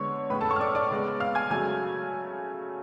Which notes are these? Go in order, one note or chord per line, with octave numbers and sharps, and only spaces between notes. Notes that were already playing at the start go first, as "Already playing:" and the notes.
Already playing: D3 G#3 B3 C#5 C#6
A2 G#3 C#4 B4 B5
A4 A5
C#5 C#6
F6
D5 D6
D5 D6
C#3 G#3 B3
F5 F6
G#5 G#6
C#3 F#3 A3 G#5 G#6